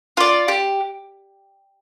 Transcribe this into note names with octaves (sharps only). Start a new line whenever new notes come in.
F4 D5
G4